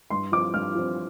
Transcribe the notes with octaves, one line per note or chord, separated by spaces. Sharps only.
G2 C6
F3 C4 D6
G2 F6
F3 C4